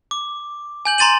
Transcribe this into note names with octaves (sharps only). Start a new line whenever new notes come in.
D6
G#5 G6 F#7
A#5 C6 A6 D#7 F#7